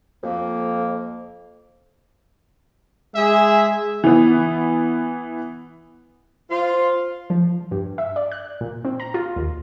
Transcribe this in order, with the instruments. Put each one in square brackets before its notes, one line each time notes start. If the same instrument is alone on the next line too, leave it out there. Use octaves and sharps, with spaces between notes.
[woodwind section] F2 A#3
[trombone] G#3 [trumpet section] G#4 E5
[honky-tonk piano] E3 B3
[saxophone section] F4 [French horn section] C5
[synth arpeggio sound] F3
G2
E5
D5
F#6
A#2
C4
A#5
F4
D#2